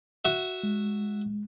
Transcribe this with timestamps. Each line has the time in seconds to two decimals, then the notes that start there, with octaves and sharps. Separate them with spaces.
0.25 F#4 E5
0.63 G#3